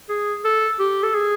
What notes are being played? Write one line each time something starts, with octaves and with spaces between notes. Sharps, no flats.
G#4
A4
G4
A4
G#4